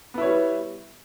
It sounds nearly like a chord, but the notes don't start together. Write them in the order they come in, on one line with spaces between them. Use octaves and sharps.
B3 E4 C#5 G3